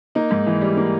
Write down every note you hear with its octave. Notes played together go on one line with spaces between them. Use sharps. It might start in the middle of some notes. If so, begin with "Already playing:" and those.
A#3 D#4
G#2
E3
G3
A#3